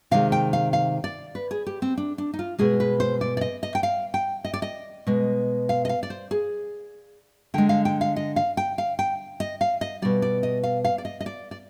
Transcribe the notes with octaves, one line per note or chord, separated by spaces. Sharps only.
C3 D#3 G#3 F5
G5
F5
F5
D5
B4
G#4
G4
C4
D4
D4
D#4
F4
B2 G#3 G#4
B4
C5
D5
D5
D#5
D#5
G5
F5
G5
D#5
D5
D#5
B2 G#3
F5
D#5
F5
D5
C5
G#4
D3 G#3 G5
F5
G5
F5
D#5
F5
G5
F5
G5
D#5
F5
D#5
B2 G3 D5
D5
D#5
F5
F5
D5
D#5
D#5
D5
D5